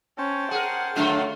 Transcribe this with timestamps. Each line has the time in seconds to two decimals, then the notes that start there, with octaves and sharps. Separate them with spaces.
0.18 C#4 C5 G5 A5
0.51 G#4 A#4 F#5
0.96 D3 F#3 A3 D4 F4